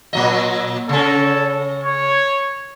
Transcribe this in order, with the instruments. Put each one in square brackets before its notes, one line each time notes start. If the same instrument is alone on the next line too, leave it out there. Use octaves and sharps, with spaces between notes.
[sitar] A#2 F#3 D#5
[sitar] C#3 C#4 [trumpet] A4
[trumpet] C#5